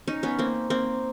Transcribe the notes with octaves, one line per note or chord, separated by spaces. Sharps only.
C#4 D#4
B3 C#4
A#3 C4
A#3 C4